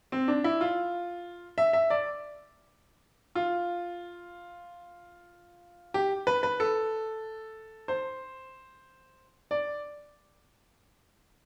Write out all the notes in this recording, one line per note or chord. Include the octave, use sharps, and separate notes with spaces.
C4
D4
E4
F4
E5
E5
D5
F4
G4
B4
B4
A4
C5
D5